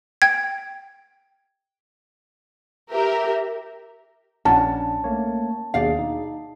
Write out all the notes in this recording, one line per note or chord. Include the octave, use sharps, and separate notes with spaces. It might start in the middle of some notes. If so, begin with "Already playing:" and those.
G5 G#6
G4 A#4 E5
A#1 C#4 D4 F#4 A5
A3 A#3 C#5
D#2 B2 D4 G#4 D5 F5
D#4